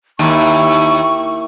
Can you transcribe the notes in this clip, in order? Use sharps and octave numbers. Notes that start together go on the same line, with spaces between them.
D#2 A#3 E4 G4 C#6